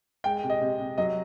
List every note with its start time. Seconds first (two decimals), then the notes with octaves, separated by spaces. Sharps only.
0.24 G#3 G5
0.44 C3
0.50 D#5
0.61 C3
0.80 C3
0.98 F#3 D#5